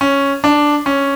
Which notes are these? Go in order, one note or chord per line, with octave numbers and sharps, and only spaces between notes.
C#4
D4
C#4